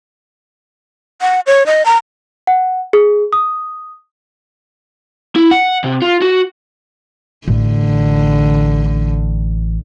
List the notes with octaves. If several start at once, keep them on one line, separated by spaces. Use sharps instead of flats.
F#5
C#5
D#5
A#5
F#5
G#4
D#6
E4
F#5
C3
F4
F#4
A1 D3